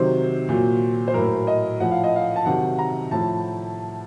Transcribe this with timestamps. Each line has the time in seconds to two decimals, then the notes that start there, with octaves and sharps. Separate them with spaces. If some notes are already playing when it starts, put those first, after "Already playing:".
Already playing: C3 D#3 F#3 C5
0.49 A#2 F#3
1.08 C5
1.14 A2 F#3 A#4
1.47 D#5
1.80 A2 F3 F#5
1.92 F5
2.04 D#5
2.16 F5
2.36 A5
2.45 C3 D#3 F#3 F#5
2.79 A#5
3.11 A2 F3 A5